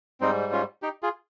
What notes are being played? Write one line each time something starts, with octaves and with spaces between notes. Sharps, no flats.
G#2 G3 C4 D#4
C#4 F4
D#4 G4
F4 G#4